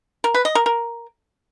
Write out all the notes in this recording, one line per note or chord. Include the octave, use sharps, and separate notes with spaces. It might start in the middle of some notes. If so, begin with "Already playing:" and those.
A#4
B4
D#5
A#4
A#4